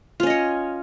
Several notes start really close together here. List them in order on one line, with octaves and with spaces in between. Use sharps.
F4 C#4 D#5 C#5